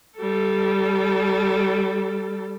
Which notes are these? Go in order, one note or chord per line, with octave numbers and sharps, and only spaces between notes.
G3 A4